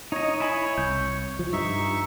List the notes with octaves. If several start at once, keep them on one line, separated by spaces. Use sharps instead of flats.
D#4 C#5 D#5
E4 G#5 B5
C2 G6
F3
G2 D#4 E5 C#6